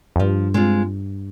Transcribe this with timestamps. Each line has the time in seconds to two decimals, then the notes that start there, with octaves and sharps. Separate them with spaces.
0.16 F2
0.20 G2 F3
0.54 G#3 C4 F4